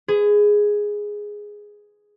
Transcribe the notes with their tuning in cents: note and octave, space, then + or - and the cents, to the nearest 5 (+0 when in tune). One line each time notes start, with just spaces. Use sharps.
G#4 +0 B4 +40